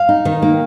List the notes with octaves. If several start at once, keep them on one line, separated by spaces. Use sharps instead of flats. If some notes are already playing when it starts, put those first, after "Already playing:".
Already playing: F5
D#4
D#3
A#3